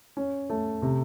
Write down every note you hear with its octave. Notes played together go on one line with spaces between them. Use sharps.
C#4
A3
C3